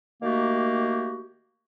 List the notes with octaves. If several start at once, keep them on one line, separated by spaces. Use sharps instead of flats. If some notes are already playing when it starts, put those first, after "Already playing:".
D#3 A3 A#3 F#4 G4